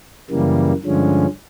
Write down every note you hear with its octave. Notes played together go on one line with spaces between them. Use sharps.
F#2 C#3 E3 G3 A#3
G2 D3 F3 G#3 C#4